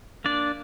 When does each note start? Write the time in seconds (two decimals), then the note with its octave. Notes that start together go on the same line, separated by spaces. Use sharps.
0.24 A#3 D4 D5